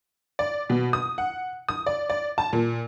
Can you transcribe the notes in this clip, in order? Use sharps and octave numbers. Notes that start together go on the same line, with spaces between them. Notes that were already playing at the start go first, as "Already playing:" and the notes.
D5
B2
D#6
F#5
D#6
D5
D5
A5
A#2